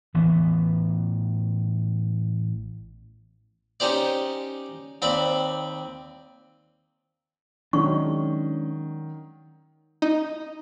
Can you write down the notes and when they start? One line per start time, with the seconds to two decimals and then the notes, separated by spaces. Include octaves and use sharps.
0.14 A1 E3 B3
3.80 C#4 D#4 G4 C5 D5
5.02 D#2 C4 D5 B5
7.73 D#3 F#3 G#3 C#4 D4 C#6
10.02 D#4